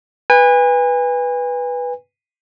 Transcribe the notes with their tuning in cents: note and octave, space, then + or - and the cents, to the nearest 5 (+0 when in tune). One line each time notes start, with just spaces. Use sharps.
B4 -5 G#5 -35